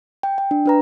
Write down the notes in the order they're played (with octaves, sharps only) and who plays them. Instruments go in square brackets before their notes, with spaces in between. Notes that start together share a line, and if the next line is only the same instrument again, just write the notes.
[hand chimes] G5
G5
D4
D4 B4 A#5